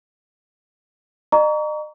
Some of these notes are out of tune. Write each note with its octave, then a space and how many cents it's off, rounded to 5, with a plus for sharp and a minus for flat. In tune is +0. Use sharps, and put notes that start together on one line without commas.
D#5 -45 A#5 +0 C#6 +40